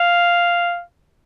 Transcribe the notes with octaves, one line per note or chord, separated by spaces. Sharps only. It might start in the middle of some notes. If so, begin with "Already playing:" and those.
Already playing: F5